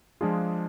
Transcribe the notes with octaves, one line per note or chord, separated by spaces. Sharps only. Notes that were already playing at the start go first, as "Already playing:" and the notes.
F3 G#3 D4 F4 G#4